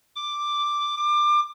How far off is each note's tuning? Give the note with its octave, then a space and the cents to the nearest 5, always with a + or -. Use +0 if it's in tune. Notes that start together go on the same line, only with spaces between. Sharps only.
D6 +5
D6 +25